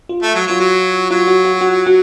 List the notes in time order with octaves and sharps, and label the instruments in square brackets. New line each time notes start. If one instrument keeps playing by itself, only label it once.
[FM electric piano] F4
[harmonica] A3
F#3
[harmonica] F#3 [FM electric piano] F4
[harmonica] F#3 [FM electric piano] F#4
[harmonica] F#3 [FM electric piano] F4
[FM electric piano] F#4
F#4
F#4
F#4